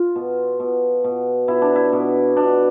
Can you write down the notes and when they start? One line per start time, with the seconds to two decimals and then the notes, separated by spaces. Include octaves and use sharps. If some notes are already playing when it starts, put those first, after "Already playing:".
Already playing: F4
0.16 B2
0.60 B2
1.04 B2
1.48 B2 E4
1.62 D4
1.75 E4
1.92 B2
2.36 B2 D4